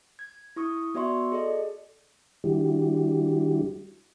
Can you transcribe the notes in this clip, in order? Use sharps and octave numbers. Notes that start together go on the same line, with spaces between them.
G#6
E4 C#6 D#6
B3 F#4 D5 E5 C6 C#6
G#4 A4 D5 D#5
D#3 G3 D4 E4 F#4 G4